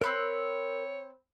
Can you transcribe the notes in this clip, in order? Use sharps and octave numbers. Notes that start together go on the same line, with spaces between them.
C4 A#4 C#5 B5 E6 F#6